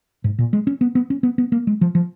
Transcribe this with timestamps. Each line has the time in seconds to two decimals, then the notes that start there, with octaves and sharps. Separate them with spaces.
0.24 G#2
0.38 A#2
0.53 G#3
0.67 C#4
0.81 B3
0.95 B3
1.10 C#4
1.23 B3
1.38 B3
1.52 A#3
1.67 G#3
1.81 F3
1.95 F3